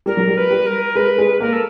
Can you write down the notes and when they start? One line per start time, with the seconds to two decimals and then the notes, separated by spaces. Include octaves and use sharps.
0.06 G3 A#4
0.17 F#3
0.27 G3
0.36 B4
0.51 G3
0.66 A#4
0.95 G#3 B4
1.18 G#3
1.40 A#3 A#4
1.52 A4